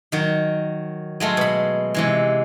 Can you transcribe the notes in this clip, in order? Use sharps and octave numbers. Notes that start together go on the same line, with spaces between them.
D#3 F#3
F#3 G#3 A3 F4
B2 B5
C3 E3 G#3